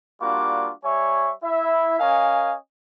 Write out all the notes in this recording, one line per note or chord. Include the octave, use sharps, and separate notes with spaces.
G3 A#3 D4 F4 F#4 D6
G3 C#5 E5 G#5 C#6
E4 E5
C#4 A#4 D#5 F5 G#5